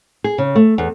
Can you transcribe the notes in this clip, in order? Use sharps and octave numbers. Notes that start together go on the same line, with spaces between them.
G#4
C#3
A3
E2